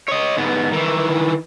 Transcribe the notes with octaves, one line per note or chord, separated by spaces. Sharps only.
C#5 D#5
G#2 B3
D#3 E3